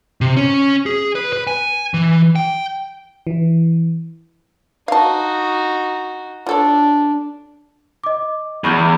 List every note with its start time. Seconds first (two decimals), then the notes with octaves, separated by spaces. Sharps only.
0.21 C3
0.37 C#4
0.86 G#4
1.15 B4
1.33 B4
1.47 G#5
1.94 E3
2.36 G5
3.27 E3
4.88 D#4 F#4 F5 A5
6.47 D4 F4 A4 C#5
8.04 D#5 D6
8.64 E2 B5 C#6 G6